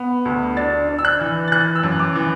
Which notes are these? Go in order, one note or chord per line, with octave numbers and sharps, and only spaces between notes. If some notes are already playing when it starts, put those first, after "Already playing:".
Already playing: B3
D2
D4 A6
D4
E6
F#6
E3
A6
E3 F#6
E6
F#2
D6
E3